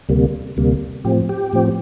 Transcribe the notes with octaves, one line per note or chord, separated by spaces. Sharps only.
D2 C3 G3 A#3
D2 C3 G3 A#3
A2 F3 C4 G4
G4
A2 F3 C4